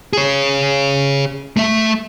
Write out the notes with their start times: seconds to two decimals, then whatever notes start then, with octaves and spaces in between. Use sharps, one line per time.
0.13 G#4 C#5
1.57 A3 E5